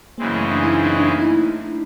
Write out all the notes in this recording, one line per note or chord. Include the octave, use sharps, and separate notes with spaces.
F#2 C#3 E3 G#3 A#3 C4
A3
D4
E4
D#4
D#4
D4
D#4
E4